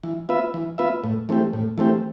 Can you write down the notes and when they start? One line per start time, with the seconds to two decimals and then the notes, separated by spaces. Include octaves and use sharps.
0.03 E3
0.29 B3 F4 B4 E5
0.54 E3
0.78 B3 F4 B4 E5
1.04 A2
1.29 E3 A3 C4 G4
1.53 A2
1.78 E3 A3 C4 G4